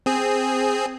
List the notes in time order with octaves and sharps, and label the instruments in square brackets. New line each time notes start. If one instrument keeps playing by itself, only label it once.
[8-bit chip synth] C4 G#4